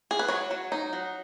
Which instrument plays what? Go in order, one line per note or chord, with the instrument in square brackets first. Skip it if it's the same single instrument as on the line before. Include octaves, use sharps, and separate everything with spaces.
[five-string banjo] G#4
B4
F#3 C#5
F#3
D#4
F#3